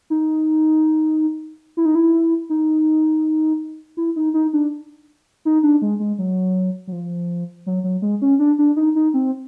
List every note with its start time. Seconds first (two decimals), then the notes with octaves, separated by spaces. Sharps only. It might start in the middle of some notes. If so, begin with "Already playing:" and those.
0.10 D#4
1.77 E4
1.85 D#4
1.95 E4
2.50 D#4
3.97 E4
4.16 D#4
4.34 D#4
4.53 D4
5.45 D#4
5.63 D4
5.82 G#3
6.00 G#3
6.19 F#3
6.87 F#3
6.92 F3
7.66 F#3
7.84 F#3
8.02 G#3
8.22 C#4
8.39 D4
8.59 D4
8.76 D#4
8.95 D#4
9.14 C4